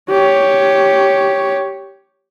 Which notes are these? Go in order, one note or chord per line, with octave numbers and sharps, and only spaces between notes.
G4 C#5